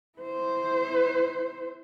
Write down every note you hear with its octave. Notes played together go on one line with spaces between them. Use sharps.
E4 C5